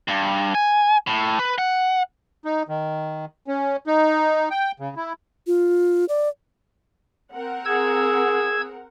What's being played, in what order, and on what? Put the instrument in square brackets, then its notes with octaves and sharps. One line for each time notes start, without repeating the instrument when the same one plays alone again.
[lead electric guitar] G2
G#5
A2
B4
F#5
[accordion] D#4
D#3
C#4
D#4
G5
C#3
E4
[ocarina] F4
D5
[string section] C4 A#4 F#5
[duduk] G#4 [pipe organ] E6 G#6